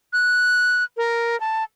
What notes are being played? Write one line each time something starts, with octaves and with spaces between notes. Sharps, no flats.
F#6
A#4
A5